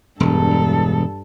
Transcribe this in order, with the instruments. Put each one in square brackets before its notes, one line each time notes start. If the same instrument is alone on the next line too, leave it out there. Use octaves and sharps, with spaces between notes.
[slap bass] E1 [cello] G2 A4